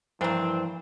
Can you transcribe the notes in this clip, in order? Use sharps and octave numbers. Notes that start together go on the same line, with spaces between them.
G2 E3 F3 A#3 C4 D4 C5